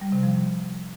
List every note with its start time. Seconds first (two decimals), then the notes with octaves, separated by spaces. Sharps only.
0.01 G3
0.12 C3
0.23 F3